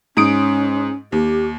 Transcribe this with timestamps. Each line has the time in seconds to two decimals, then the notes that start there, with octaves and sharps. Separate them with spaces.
0.17 G#2 C#4 D#6 D7
1.12 D#2 G4